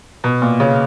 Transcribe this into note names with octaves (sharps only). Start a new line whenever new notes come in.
B2
A#2
C#3